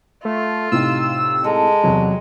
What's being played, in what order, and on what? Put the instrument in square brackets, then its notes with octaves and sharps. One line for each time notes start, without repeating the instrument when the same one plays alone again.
[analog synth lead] A3 [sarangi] F4
[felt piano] A2 C3 D#4 [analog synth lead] E6
[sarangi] G#3 [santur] A4 A#5
[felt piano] E2 C3 [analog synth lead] F#3